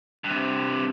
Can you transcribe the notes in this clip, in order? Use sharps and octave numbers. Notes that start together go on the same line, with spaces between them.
G2 C3